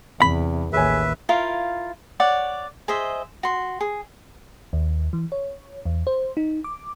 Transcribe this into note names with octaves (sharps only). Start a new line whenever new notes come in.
E2 C3 B5
A1 D#2 G#4 B4 C#5 E5 G#5
E4 F4 A#4 F5
C#5 D5 F#5
G#4 C5 D#5 E5
F#4 C6
G#4
D#2
E3
C#5
E2
C5
D#4
D6